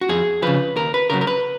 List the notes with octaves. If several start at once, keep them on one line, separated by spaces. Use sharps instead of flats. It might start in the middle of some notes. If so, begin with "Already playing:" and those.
F#4
F2 G#4
C#3 F3 B4
D#2 A#4
B4
C#3 F#3 A#4
A#4
B4